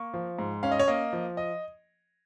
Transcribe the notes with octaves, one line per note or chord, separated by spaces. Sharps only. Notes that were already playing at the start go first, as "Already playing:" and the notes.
Already playing: A#3 C#6
F3
G#2
C#4 F5
D#5
C#5
A#3 D#5
F3
D#5